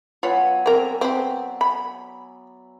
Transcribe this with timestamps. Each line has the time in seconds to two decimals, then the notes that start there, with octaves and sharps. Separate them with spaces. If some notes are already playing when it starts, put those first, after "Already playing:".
0.23 F#3 B3 F4 B4 C#5 G#5
0.66 C4 A#4 D5 E5
1.01 C4 B4
1.61 B5